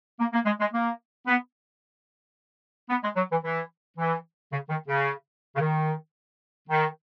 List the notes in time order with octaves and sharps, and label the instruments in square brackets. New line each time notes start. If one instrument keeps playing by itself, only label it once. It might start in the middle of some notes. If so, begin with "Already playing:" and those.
[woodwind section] A#3
A#3
G#3
G#3
A#3
B3
B3
G#3
F#3
E3
E3
E3
C#3
D#3
C#3
C#3
D#3
D#3